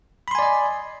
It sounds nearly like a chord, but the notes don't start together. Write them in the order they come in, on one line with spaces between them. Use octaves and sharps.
B5 C6 G#5 D5 D#5